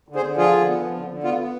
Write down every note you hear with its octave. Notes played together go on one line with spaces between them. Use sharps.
D3
G#4 C5
D3
F3 F4 G#4
D3
B3
F3
D3
D3
B3 F4
B3